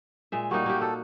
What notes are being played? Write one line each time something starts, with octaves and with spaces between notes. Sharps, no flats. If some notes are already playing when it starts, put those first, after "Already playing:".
A#2 G#3 E5
G3 A#3 D#4 F#4
A#3 G4
F#4 A4